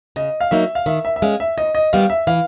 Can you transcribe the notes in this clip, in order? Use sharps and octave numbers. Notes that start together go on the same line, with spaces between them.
C#3 D#5
F5
F#3 A#3 D#4 E5
F5
D#3 E5
E5
E5
G#3 C#4 F5
E5
D#2 D#5
D#5
D#3 G3 B3 F5
E5
E3 F5